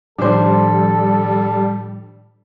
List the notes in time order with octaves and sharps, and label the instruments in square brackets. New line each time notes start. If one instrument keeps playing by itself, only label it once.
[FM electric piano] A2 D#3 F3 [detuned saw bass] G3 [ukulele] D4 C5 [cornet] A4